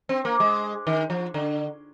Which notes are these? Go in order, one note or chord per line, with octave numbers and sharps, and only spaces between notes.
C4
A#3
G#3
D#3
F3
D3